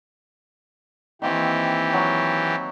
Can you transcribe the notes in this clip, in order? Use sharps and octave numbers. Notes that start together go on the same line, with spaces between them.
D#3 E3 A#3 C4 G4
F#3